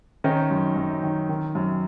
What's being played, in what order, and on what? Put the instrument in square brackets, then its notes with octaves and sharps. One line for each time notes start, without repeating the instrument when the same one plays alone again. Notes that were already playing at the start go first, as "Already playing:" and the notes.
[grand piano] D#3 C#4 D#4
F#2
F#2
D#3
D#3
F#2